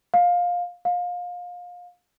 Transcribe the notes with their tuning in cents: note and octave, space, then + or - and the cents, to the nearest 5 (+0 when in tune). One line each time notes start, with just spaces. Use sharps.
F5 +15
F5 +25